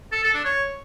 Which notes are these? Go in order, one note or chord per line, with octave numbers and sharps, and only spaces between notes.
A4
A4
D4
C#5